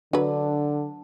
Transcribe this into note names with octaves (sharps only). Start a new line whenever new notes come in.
D3 F#3 D4 B4